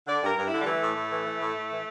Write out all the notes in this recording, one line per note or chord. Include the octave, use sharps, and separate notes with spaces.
D3 D5
G2 A#4
G2
E4
D3
G3
E3 A3
A2
A2
E3
E3
A2
A2
E3